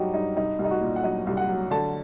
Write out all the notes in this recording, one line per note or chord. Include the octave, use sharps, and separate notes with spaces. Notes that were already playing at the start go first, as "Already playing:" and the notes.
Already playing: G2 F#3 D#4 G4
G2 D#4
C2 D#4
C2
D#4
F#4
A#2
F#5
F#3 D#5
C2
F#5
F#3
D3 A5